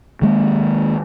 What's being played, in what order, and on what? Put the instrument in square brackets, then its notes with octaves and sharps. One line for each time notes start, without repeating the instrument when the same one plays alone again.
[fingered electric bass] D#3 G#3 A#3